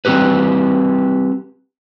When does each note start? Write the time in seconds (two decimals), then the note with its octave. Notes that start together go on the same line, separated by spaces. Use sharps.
0.05 G3 C4 F#4 G4 B4